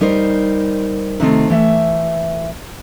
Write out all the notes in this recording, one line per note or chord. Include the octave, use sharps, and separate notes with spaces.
G3 D#4 A#4 C5
C3 D#3 A3 C4
E3 A3 E5